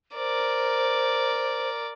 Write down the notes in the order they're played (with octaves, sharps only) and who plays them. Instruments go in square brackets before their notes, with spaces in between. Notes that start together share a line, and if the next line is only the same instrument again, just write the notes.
[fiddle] A#4 D5 [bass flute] C5